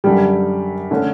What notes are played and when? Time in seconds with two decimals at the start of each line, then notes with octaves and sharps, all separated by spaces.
0.04 F#2 D3 G3 G4
0.91 D3 A3 C#4